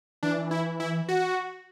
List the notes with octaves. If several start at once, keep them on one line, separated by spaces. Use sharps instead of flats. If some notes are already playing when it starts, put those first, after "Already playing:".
E3 D4
E4
E4
F#4